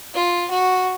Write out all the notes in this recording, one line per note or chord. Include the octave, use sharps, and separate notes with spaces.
F4
F#4